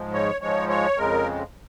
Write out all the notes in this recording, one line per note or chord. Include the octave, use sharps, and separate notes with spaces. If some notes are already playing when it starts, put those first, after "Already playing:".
Already playing: G#2 F3 G#3
C#5
G#2 F3 G#3 C#5
C#5
F2 C#3 G#3 A#4